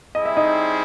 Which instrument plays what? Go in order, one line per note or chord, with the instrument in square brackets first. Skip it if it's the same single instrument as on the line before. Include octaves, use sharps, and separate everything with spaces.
[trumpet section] G3 C4 E4 G#4 [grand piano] D#5
[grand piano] E5
D#4 D#5